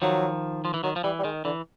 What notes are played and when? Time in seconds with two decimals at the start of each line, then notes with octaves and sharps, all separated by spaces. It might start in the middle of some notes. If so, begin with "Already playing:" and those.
0.02 D#3 F3 F#3
0.65 F3
0.74 E3
0.84 D#3 F#3
0.96 F3
1.04 E3 G3
1.19 G3
1.24 D#3 G#3
1.45 D3 E3